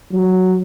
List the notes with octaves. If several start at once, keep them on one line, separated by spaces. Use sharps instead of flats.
F#3